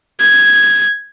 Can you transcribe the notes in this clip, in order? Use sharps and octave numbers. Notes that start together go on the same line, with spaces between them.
G#6